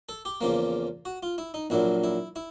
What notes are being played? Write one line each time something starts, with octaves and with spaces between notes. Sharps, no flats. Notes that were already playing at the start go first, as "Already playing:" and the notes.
A4
G4
E2 C#3 F3 A#3
F#4
F4
E4
D#4
A#1 A#2 F#3 E4
E4
E4